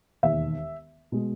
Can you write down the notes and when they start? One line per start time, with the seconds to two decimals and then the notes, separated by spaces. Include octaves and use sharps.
0.23 E1 D#2 D#3 E5
1.12 B2 G#3